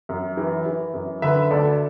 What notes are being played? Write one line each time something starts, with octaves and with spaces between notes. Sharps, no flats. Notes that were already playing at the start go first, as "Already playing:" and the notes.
F#2
E3
E3
F#2
D3 B4 E5
D2 A4 D5